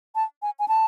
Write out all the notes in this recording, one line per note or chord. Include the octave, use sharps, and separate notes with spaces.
A5
G#5
G#5
A5